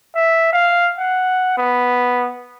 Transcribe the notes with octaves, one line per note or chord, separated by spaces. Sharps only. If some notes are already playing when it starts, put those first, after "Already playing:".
E5
F5
F#5
B3